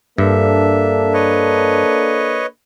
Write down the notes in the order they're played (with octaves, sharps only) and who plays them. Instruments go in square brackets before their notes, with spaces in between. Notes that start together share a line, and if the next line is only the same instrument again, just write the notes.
[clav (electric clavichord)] G2 [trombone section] A#3 D4 A4 [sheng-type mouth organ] E5
[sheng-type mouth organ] B4 C#5 D#5